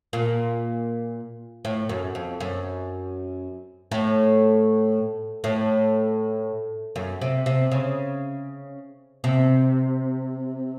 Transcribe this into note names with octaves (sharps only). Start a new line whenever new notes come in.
A#2
A2
F#2
F2
F#2
A2
A2
F#2
C3
C3
C#3
C3